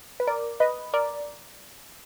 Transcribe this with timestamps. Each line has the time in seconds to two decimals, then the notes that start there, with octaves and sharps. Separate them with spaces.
0.20 B4
0.27 A#4 D5
0.60 B4 D#5
0.94 A#4 D5